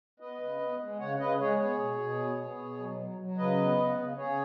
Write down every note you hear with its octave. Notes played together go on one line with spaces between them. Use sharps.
B3 B4 D#5
C#3
B3
G#3
C#3 C#5 F#5
C#3 B4 D#5
G#3 G#4 C#5
B3 G#4 C#5
B2
B2
B3
B3
B2
F#3
F#3
F#3
C#3 B4 D#5
B3
C#3
C#3
C#3 G#4 C#5